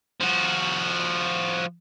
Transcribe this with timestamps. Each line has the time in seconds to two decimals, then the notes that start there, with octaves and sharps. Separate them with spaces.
0.20 F3 F#4